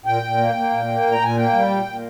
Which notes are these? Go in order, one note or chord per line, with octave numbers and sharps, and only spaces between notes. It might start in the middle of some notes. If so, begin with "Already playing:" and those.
A#2 G5
A#2
A#3
A#3
A#2
A#3
A#2
A#5
A#2 G#5
A#3 G5
G3
A#2
A#2